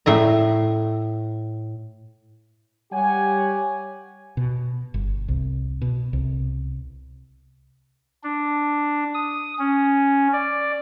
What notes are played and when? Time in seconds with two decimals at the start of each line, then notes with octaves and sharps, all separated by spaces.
0.06 A2 E5 A#5
2.93 G3 G4 C#5 F#5 G#5
4.37 B2
4.94 G1
5.28 C2
5.82 B2
6.13 C2
8.23 D4
9.14 D#6
9.59 C#4
10.33 D5